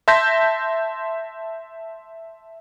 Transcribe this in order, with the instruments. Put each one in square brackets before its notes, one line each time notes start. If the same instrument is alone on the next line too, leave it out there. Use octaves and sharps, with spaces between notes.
[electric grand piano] E5 A5 C6 G6 A#6 B6